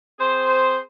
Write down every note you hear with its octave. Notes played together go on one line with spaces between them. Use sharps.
C4 G#4 C5